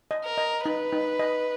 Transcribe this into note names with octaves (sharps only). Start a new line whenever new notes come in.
D#5
A#4
D#5
D#4 B4
D#4
D#5